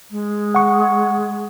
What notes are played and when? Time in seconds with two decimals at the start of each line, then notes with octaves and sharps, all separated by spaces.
0.10 G#3
0.55 F#5 C#6